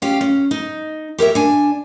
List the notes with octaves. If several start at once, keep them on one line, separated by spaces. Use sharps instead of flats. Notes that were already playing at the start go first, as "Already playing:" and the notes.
C#4 F4 G4 F5
C#4
D#4
G4 A#4 C#5 E5
D4 G#5